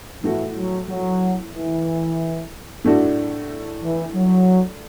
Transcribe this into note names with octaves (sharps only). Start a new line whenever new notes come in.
A2 E3 A3 F#4
F#3
F#3
E3
A2 A3 D4 F#4
E3
F#3